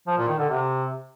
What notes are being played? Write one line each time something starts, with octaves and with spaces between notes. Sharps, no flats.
F3
A#2
D#3
D3
C3